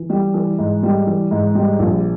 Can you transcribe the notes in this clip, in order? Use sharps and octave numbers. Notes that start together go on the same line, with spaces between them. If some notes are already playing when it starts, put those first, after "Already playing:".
Already playing: E3
G3
E3
G#2
G3
E3
G#2
G3
A#1